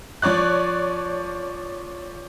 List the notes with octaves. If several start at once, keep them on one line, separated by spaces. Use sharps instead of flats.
F3 C#5 D5 F#6